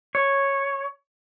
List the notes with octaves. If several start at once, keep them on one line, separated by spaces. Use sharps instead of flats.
C#5